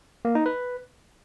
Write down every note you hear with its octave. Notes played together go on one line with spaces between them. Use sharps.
A#3
D#4
B4